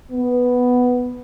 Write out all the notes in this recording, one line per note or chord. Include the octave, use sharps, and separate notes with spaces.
B3